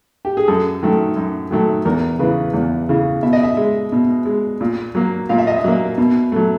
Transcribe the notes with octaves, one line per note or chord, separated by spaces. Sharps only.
G4
G#4
F#2 A4
D#3 F#3 A3
F#2
D#3 F#3 A3
E2 A#4
C#3 E3 B4
E2
C#3 E3
B2 E5
D#5
E5
G#3
B2
G#3
A#2
F#3 A#3
A#2 F5
E5
D#5
E5
F#3 A#3
B2
F#3 A3